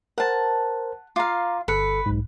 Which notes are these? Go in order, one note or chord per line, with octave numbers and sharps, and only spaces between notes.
A#4 C5 F#5 A5
F4 F5 A#5 D6
G1 A4 B4 C#7
B1 G#2